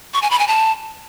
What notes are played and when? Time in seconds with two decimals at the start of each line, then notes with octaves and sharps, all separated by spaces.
0.14 C#6
0.22 G#5
0.31 B5
0.39 G#5
0.48 A5